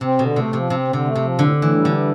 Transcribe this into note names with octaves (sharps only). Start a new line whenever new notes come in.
C3 C4
B2 D3
C3 A3
C3 F3
C3 C4
D3
C3
A3
C3
F3
A2 D3
A2
E3
G3
D3
E3